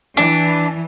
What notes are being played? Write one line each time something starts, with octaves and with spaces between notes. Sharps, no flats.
E3 D4